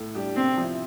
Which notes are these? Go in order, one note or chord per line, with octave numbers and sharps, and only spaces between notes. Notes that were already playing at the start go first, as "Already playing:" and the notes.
Already playing: A2
G3 D4 G4
C3 C4
F3 C4 E4